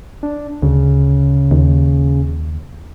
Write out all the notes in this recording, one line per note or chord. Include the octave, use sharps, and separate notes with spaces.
D4
D2 C#3
D#2